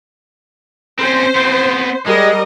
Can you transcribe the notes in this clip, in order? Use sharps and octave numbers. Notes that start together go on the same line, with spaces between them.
C4 C#4 C5
B3 C4
G3 G#3 A#4 D#5